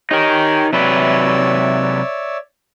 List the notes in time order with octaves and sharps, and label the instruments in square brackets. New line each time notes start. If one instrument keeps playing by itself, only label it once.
[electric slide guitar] D#4 A#4 [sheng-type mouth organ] G4 C#5 G#5
[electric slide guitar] C3 F#3 B4 [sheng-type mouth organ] C#5 D5 E5